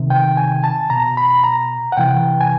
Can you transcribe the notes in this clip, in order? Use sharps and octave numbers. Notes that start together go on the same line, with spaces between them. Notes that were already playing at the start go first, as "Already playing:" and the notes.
Already playing: C3 D#3
G5
G#5
A5
B2 A#5
B5
A#5
F#5
C3 E3 G5
G#5